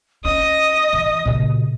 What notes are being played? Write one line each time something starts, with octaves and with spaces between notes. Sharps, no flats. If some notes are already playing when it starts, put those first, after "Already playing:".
C#4 D#5 D#6
E3
A#2 C#3